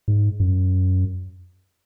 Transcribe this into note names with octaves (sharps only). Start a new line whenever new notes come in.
G#2
F#2